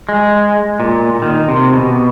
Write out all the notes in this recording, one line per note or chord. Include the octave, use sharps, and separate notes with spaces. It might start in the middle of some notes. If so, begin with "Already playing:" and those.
G#3
A#2
D#3
C3
B2